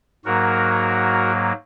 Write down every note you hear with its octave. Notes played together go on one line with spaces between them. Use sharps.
G#2 F#3 A#3 F#4 A#4